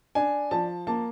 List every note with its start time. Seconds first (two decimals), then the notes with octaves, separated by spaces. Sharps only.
0.15 D4 G#5
0.51 F3 A5
0.87 A#3 A5